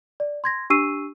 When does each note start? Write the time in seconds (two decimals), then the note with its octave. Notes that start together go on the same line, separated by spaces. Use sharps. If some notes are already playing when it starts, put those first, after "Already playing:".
0.20 D5
0.44 C6 G#6 A#6
0.70 D4 G4 C#6 E6 C7 D#7